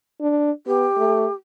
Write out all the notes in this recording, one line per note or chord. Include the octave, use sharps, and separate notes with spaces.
D4
B3 G4
A3